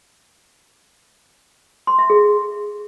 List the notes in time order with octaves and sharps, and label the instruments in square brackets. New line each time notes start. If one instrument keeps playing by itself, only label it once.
[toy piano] C6
E5
G#4